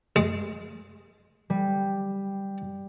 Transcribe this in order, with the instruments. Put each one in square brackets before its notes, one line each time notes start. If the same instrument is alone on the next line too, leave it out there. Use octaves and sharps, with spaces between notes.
[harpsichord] G#3
[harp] G3